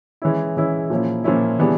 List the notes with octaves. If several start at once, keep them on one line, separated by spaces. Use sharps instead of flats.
E3 G#3 C#4 E4
E3 G#3 C#4 E4
A#2 F3 A#3 C#4 E4
A#2 F3 A#3 C#4 E4
C#3 E3 G3 B3 D4